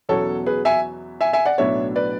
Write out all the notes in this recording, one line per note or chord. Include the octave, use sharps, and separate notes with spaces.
E2 B2 F#3 C#4 E4 A4 C#5
G#4 B4
E5 G#5
E5 G#5
E5 G#5
D5 F#5
B1 A2 F#3 B3 D4 C#5 E5
B4 D5